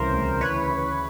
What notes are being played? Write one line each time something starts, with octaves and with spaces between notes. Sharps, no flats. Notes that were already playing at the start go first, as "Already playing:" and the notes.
Already playing: C2 C#3 E3 A#4 C5
D2
E3 B4 C#5
E3